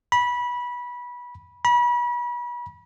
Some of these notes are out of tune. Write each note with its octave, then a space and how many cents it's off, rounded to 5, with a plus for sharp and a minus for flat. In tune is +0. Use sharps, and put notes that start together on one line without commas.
B5 -20
B5 -35